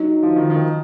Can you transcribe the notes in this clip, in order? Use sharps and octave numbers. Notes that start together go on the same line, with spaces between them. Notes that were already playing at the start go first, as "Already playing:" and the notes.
Already playing: F#3 D#4
F3
D#3
D#3